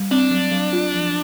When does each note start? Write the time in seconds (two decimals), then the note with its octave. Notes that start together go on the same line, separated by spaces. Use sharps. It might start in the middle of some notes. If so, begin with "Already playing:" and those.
Already playing: G3
0.11 C4 D4
0.31 F#3
0.51 F#3
0.73 F4
0.94 F3